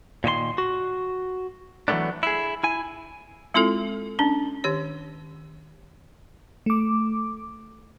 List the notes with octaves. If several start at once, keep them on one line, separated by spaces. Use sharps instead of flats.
A#2 D#3 C5 C6
F#4
E3 F#3 G#3 A3 B3 D4
E4 G#4
E4 G#5
G#3 C4 E4 F4 A4
C#4 D4
D#3 G4 C#5
A3 D6